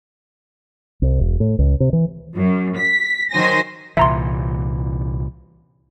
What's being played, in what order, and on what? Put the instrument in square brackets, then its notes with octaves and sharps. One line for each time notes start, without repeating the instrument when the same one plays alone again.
[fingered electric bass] C2
E1
A2
C#2
C3
E3
[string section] F#2
B6
D#3 F#3 C5 G#5 A#6
[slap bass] C2 A#2 E3 [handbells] E5 A#5 C6